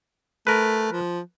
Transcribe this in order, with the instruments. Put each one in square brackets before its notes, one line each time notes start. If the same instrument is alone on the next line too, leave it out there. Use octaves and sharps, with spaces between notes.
[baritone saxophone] A3 [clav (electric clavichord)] A#4 B4
[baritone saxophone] F3